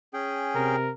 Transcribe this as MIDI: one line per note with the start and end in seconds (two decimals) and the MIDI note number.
0.14 0.76 61
0.14 0.76 68
0.14 0.76 79
0.55 0.91 48
0.55 0.92 70